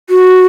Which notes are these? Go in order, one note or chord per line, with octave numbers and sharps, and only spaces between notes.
F#4